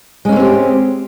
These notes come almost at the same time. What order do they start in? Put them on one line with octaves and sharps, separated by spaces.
G#3 C#4 A#3 C4 G4